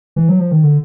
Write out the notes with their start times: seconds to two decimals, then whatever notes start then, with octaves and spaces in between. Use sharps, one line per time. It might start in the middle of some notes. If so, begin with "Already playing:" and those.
0.16 E3
0.29 F#3
0.39 F3
0.51 D#3
0.63 D3